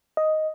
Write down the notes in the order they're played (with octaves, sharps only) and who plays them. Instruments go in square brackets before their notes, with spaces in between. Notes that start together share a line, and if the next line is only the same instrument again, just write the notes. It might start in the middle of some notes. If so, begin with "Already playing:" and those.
[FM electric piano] D#5